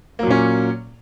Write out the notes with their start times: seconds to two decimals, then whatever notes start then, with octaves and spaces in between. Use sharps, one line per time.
0.19 A#3
0.23 F#3
0.27 A#2
0.31 C#4